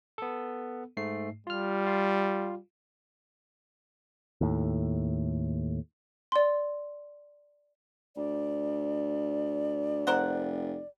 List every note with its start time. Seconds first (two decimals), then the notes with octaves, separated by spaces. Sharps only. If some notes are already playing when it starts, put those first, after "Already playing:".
0.18 B3 A4
0.97 G#2 A3 C7
1.47 G3 F4 F6
1.87 F4 F5
4.41 D#2 A2
6.32 D5 C6
8.16 D2 D5
10.07 F1 A#4 C5 F#5